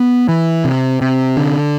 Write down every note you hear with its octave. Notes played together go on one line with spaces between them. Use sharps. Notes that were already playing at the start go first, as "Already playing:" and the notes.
Already playing: B3
E3
C3
C3
D3